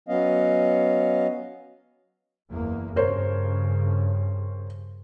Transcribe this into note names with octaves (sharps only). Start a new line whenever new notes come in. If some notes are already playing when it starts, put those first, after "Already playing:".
F#3 B3 C#4 D#5 F5
F#1 E2 A#3
G2 C#3 A#4 C5 C#5